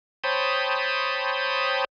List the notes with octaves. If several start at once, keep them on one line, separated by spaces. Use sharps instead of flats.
C5 C#5 G5 A5 B5 D#6